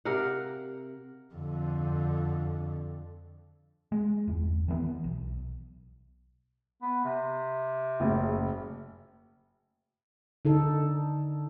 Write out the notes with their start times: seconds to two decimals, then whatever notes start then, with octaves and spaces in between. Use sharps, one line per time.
0.05 C3 A#4 F5 F#5
1.35 F2 D3
3.92 G#3
4.28 G1 E2
4.68 D#3 E3 A3 B3
5.04 B1
6.82 B3
7.05 C3
8.00 F#1 A2 C#3
10.45 D3 D#4 A4